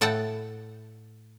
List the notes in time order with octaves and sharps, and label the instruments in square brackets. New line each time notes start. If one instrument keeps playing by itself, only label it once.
[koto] A2 A4 F#5 G5 A5